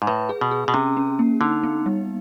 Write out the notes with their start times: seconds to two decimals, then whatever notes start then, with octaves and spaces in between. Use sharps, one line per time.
0.02 G#2
0.07 A2 B4
0.29 G#4
0.41 B2
0.51 G#4
0.68 B2
0.74 C3 C#4
0.97 C#4
1.19 A#3
1.41 D3 D#4
1.64 B3
1.86 G3